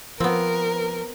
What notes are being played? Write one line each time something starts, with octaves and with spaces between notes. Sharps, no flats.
F3 B3 C4 A#4